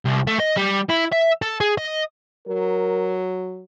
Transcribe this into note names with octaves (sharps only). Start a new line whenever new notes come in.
C2
A3
D#5
G3
E4
E5
A4
G#4
D#5
F#3 A#4